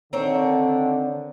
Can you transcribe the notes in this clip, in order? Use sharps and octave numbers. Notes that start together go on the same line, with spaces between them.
D3 D#3 C4 A#4 C#5